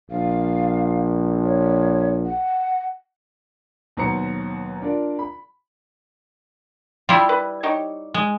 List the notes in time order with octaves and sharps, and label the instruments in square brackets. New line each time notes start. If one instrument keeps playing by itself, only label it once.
[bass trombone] A#1 [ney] F5
[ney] C#5
F#5
[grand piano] D#2 B2 F#3 C5 A#5 C#7
D4 F4 A#4 D5
B5
[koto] G3 E4 [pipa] F4 C6
[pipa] B4
D#4 G4 C#5
[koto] G#3